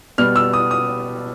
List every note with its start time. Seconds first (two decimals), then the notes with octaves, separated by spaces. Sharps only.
0.18 B2 G3 B3 F6
0.36 E6
0.53 D#6
0.71 D#6